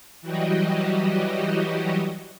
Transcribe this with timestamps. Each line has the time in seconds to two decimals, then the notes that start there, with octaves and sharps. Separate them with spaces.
0.22 E3 F#3 G3 F#4 G4 D#5